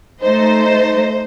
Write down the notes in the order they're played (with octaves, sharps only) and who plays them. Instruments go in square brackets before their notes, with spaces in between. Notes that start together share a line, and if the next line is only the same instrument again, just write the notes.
[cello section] A3 D#4 [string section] C5